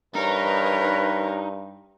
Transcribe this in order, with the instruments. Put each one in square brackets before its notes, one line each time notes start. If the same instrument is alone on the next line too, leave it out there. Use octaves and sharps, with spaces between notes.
[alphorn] G2 [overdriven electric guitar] D#4 [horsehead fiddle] A#4 C#5 [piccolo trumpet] B4